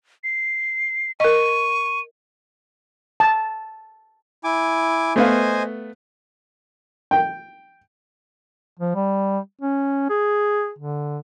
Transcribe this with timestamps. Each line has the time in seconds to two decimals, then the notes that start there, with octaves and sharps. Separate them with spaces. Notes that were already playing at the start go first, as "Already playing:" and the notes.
0.24 C7
1.20 A#4 D#5 C#6 D#7
3.20 A5
4.44 E4 G#5 D6
5.16 A3 B3 C5 D#5 F5 G#5
7.11 G5
8.79 F3
8.95 G3
9.61 C#4
10.10 G#4
10.78 D3